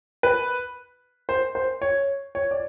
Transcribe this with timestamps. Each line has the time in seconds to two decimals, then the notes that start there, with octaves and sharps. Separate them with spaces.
0.23 B4
1.29 C5
1.55 C5
1.82 C#5
2.35 C#5
2.51 D5